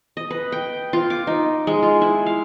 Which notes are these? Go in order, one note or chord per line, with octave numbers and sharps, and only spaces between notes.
D#5
B4
G5
F4
D6
D#4
G#3
F4
E4
F5